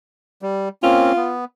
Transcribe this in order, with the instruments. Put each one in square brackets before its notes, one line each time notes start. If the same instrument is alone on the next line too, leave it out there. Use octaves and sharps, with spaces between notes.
[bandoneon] G3
[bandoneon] A#3 C4 C#4 [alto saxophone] F4
[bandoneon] B3